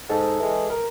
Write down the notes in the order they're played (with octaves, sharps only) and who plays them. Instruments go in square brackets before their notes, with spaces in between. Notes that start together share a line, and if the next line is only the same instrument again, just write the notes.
[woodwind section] G#2 [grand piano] A4
[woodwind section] E3 G#3
[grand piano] A#4